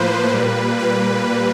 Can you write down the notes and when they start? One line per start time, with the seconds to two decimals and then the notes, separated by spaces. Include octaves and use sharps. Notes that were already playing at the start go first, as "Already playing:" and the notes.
Already playing: A2 F3 A#3 B4 C5
0.32 A#2 G3 A#3
0.79 B4